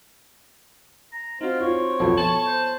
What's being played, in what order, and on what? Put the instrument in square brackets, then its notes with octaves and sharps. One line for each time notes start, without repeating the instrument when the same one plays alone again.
[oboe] A#5
[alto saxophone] C4 [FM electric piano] D#4 F#4 [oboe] F4
[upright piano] F4 [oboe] C#5
[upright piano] B1 F2 [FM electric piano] B3 F4 A4
[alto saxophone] A5 [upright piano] F#7
[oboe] C5